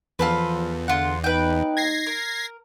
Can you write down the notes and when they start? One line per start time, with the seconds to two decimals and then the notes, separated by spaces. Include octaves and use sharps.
0.19 E2 F3 F4 A4 B4
0.88 D3 F4 F#5
1.24 D#4 B4 G5
1.77 G#6 A#6 C7
2.06 A#4